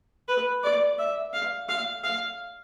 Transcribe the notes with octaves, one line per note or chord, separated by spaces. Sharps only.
B4
D5
E5
F5
F5
F5